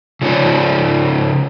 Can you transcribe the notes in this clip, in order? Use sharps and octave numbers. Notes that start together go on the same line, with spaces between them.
C#3 F3 C#5 D5